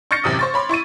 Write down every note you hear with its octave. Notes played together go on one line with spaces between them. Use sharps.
C#6 F6 G6 A6 A#6 C#7
A1 F#2 C3 D#6
C5 C#6 A6
C#5 B5 C6 D6
E4 C#6 A6 D#7